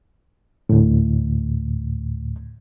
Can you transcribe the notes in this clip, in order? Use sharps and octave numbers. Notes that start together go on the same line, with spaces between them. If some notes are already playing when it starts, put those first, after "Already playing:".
D2 A2